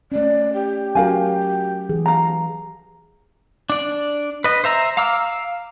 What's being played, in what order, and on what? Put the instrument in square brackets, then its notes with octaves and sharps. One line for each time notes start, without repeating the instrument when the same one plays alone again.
[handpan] A3 C#4 [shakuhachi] D5
[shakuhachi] G4
[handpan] F#3 C#4 F#4 [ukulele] A#4 F5 G#5
[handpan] E3 G#4
[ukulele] F5 A#5
[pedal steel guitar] D4 D5
B4 D#5
C5 E5 A#5 E6
F5 A#5 D6 E6 F6